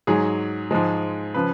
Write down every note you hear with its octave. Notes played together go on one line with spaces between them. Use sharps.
G#2 F#3 G#4
G#2 F3 G#3
C#3 F3 B4